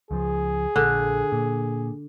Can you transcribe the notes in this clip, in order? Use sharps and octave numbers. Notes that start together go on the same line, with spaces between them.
C#2 F3 G#4
A#1 D3
A#2